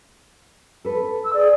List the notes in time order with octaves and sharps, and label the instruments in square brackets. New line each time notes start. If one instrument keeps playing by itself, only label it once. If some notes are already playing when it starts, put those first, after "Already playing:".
[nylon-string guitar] A4 B4
[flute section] E6
G#4 D5